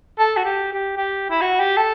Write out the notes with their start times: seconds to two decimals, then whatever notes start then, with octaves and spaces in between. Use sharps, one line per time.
0.19 A4
0.37 F#4
0.45 G4
0.72 G4
0.97 G4
1.30 E4
1.41 F#4
1.60 G4
1.77 A4